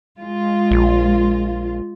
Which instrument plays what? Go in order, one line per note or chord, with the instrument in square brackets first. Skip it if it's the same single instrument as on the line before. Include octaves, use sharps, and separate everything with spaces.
[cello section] G#3 F4
[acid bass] A#1